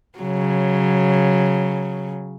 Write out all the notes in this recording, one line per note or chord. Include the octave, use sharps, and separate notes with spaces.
C#3 F#3